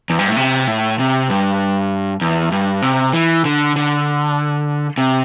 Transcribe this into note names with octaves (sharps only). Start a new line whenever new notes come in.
E2
G2
A2
C3
A2
C3
G2
E2
G2
C3
E3
D3
D3
C3